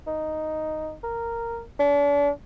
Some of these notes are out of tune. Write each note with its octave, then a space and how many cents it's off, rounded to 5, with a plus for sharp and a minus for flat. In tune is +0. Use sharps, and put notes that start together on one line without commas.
D#4 +0
A#4 -5
D4 -40